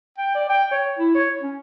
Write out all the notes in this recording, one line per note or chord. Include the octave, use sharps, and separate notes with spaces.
G5
D5
G5
C#5
E4
C#5
C#4